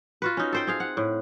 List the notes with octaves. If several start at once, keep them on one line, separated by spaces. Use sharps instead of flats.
F4 F#4 B4
C#4 D#4
A4 C5 G5
C4 G#4 F5
F#5
A2